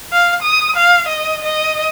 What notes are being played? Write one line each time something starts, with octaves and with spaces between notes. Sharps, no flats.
F5
D#6
F5
D#5
D#5